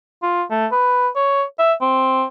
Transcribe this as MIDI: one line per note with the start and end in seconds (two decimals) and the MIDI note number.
0.23 0.43 65
0.51 0.67 57
0.72 1.08 71
1.16 1.44 73
1.59 1.73 76
1.81 2.25 60